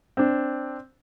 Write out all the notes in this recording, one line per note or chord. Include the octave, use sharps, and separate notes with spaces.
C4 D4